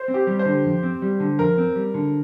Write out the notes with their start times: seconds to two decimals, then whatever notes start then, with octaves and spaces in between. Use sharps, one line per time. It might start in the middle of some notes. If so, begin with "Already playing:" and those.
Already playing: C5
0.08 C4
0.14 G4
0.27 G3
0.39 C5
0.46 D3
0.64 F2
0.83 C4
1.02 G3
1.20 D3
1.39 F2 A#4
1.58 C4
1.75 G3
1.94 D3